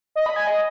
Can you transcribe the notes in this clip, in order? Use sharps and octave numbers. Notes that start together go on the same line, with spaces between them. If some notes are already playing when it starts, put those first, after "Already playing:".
D#5
B5
G#5
D#5